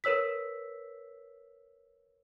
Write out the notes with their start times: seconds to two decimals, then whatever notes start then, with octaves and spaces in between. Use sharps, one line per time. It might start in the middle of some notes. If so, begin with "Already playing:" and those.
0.04 A#4 B4 C#5 E6 B6